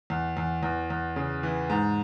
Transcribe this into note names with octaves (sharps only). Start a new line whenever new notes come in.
E2
E2
E2
E2
C#3
E3
G#2